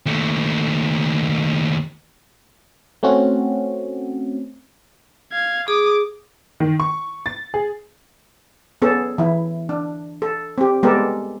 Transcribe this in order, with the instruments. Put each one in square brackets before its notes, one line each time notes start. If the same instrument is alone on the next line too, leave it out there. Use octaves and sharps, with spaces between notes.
[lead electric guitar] D#2 A3
[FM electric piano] A3 C4 C#4 F#4
[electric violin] F5 G#6
[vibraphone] G#4 [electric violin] D6 D#6
[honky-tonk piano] D#3
C#6
A6
G#4
[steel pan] B3 C#4 G#4 A4
E3 E4
D4
A4
C4 G4
G3 G#3 B3 G4 A4 A#4